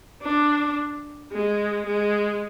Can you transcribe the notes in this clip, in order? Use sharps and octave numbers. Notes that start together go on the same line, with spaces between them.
D4
G#3
G#3